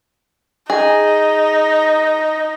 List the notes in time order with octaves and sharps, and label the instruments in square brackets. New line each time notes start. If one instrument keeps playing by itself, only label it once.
[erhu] D#4 [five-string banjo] G#4